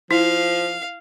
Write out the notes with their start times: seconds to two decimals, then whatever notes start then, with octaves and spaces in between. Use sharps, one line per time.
0.11 F3 E4 F5